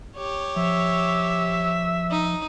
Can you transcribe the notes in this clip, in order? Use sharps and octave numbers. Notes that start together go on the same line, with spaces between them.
G4 C#5
F3 E5
D#4